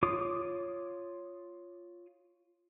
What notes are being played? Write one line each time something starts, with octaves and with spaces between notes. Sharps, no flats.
F4 C#5 D6 D#6